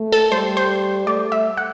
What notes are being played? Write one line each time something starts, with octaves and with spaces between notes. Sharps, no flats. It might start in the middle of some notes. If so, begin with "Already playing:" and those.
Already playing: A3
A4
G3 C5
C5
A3 D5
E5
F#5